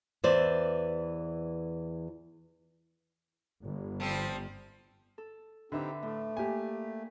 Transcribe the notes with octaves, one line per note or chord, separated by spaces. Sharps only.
E2 E3 C5 D5
G1
F3 G3 C4
A4
D3 C4 D#4 G4 B4 E5 D6
A2 A3
A#3 D4 G4 G#5